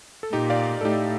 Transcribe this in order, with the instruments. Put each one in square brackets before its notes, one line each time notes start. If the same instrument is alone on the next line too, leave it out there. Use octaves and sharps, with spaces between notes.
[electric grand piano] A4
[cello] A#2 [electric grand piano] D#4 G4
[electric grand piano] D5 F5
A4
[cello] A2 [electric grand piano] D#4 G4